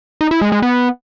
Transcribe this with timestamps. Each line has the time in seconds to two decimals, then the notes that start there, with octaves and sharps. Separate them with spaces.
0.21 D#4
0.31 E4
0.42 G#3
0.52 G#3
0.62 B3